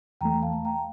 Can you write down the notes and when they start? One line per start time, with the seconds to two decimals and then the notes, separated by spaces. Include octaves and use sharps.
0.21 E2 E3 A3 G5 A#5
0.42 F5 A5
0.65 G5 A#5